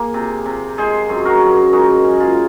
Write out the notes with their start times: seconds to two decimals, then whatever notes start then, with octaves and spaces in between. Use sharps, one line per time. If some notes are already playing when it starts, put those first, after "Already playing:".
Already playing: A#3 G#4
0.14 C3
0.46 C3
0.78 G#3 G#4 C5
1.09 F#2
1.25 F#4 A#4
1.41 F#2
1.73 G#3 D#4 F#4
2.04 C#3
2.20 F4 G#4